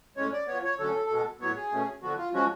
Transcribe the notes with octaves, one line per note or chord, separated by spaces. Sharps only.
A2 G#3 C#4 C#5
D5
F3 B3 C#5
C#5
D3 F#3 A3 C#4 A4
B2 G#3 B3
A2 F#3 B3 C#5
G#4
B2 A3 C#4
D3 F3 B3 F#4
F4
F3 G#3 C#4 F#4